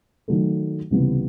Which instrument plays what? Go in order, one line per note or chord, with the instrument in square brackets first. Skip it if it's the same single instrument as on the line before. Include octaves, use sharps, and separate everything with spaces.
[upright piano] D#3 F#3 A3
C#2 C3 E3 G3 B3